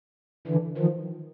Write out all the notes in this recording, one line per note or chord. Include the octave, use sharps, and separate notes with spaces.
D3 E3
D#3 F3